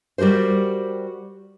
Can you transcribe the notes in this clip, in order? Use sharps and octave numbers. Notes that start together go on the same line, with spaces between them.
G3 F#4 G4 A#4 C5